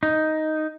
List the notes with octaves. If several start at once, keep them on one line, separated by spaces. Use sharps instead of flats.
D#4